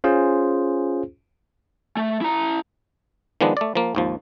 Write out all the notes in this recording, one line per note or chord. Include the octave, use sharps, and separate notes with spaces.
C#4 F4 G#4 C5
A3
E4 A#5
D#3 F3 G#3 B3 D4
A3 D5
F3 A#3
G#1 D#2 F3